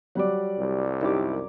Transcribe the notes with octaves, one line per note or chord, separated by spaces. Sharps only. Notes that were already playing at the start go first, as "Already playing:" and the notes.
F#3 G3 D5 F#5
C2
F#2 D#4 E4 G4 C#5 D6